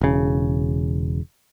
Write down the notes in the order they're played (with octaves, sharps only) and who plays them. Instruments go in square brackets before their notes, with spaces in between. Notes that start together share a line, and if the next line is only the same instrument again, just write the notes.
[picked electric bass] E1 C#3